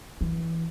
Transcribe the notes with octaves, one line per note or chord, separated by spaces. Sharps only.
E3